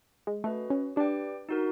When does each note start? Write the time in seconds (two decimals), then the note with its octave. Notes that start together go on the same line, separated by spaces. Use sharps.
0.27 G#3
0.44 A3 C#4 F#4 B4 D#5
0.70 C#4
0.96 D4 G4 B4 D5 G5
1.49 D#4 F#4 A#4